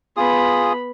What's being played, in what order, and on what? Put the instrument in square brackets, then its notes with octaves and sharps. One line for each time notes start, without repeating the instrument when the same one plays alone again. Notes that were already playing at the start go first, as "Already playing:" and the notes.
[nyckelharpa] B3 B5 [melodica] F4 G#4 D#6